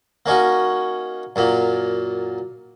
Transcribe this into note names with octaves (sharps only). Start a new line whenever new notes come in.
A#3 C#4 D#4 F#4
F#2 A#2 A#3